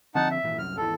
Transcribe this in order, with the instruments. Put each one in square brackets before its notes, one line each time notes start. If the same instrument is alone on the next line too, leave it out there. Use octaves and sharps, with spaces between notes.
[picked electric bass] D3 F3 C4 [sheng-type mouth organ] D#4 F#5 A5
[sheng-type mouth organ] E5
[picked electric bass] G#1 A#2 E3
[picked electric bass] C2 F#2 [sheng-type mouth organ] F6
[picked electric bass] G#1 E2 E3 [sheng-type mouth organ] A4